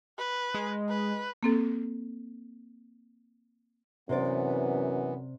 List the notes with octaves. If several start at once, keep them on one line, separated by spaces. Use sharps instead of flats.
B4
G#3
B4
A#3 C4 A4
F#2 C3 E3 B3 C5 D5